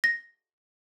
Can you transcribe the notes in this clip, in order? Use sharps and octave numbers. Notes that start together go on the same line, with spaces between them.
A#6